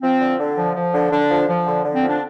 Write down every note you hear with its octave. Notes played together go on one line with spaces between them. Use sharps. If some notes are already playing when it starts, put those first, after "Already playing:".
F3 C4
D3
D3
F3
F3
D3
D3 D4
F3
F3
D3
D3
C4
F3
D4